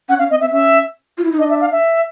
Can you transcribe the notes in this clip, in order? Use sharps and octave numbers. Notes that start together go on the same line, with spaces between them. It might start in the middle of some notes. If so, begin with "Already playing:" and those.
C#4 F#5
C#4 F5
C4 D#5
C4 E5
C#4 E5
F4
E4
D#4
D4 D#5
E5
F5
E5